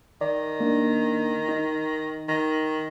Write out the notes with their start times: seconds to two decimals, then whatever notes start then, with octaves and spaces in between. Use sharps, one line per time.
0.21 D#3 D5
0.60 A#3 D4
1.49 D#4
2.28 D#3